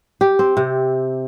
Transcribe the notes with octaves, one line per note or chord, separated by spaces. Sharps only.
G4
C4
C3